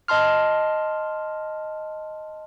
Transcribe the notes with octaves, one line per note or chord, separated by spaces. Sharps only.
D#5 A5 C6 F6